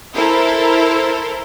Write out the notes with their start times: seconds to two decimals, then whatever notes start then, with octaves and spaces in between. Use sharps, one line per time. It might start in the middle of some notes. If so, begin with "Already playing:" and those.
0.14 E4 A4 A#4 C5